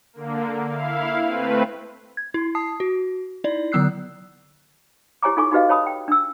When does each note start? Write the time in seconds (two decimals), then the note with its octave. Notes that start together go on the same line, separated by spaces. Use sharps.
0.13 D3 A#3
0.67 E4 F5
1.23 A3 C4 B4
2.17 G#6
2.34 E4
2.55 A5 D#6 C7
2.80 F#4
3.44 D#4 E4 D5
3.72 D3 F#3 B3 E6 F#6 C7
5.23 E4 G4 C#5 G#5 A#5 D6
5.37 D#4 F4 A4 G#5 C#6 D6
5.52 D#4 F#4 G4 B4 D#5 F5
5.69 C#5 A5 B5 D#6
5.86 G5
6.08 D4 E6